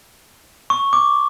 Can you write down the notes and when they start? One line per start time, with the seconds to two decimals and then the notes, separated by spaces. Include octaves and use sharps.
0.70 C#6
0.93 D6